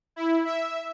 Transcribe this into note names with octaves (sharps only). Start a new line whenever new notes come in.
E4
E5